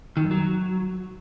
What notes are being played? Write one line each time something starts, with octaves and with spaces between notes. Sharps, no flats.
D#3
F#2
F#3